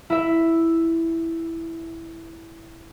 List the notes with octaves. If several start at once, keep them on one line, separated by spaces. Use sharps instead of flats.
E4 E5